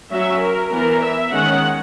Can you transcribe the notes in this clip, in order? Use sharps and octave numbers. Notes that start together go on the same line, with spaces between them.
F#3 C#4 E5
A#4
E3 B3 A#4
E5
D#3 G#3 C#4 F#5